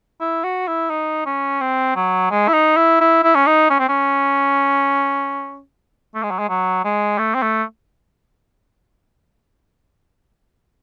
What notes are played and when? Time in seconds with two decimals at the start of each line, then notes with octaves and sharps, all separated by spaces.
0.21 E4
0.44 F#4
0.68 E4
0.90 D#4
1.26 C#4
1.61 C4
1.96 F#3
2.31 G#3
2.48 E4
2.54 D#4
2.77 E4
3.01 E4
3.24 E4
3.35 C#4
3.47 D#4
3.70 C#4
3.79 C4
3.89 C#4
6.15 A3
6.23 G#3
6.31 F#3
6.39 G#3
6.49 F#3
6.85 G#3
7.19 A3
7.35 C4
7.42 A3